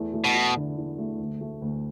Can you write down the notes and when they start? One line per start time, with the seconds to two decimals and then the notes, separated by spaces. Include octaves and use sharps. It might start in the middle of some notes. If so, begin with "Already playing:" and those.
Already playing: E2 A3
0.14 A3
0.24 B2
0.35 E4
0.56 D3
0.77 E2
0.98 A3
1.19 D2
1.41 A3
1.62 D2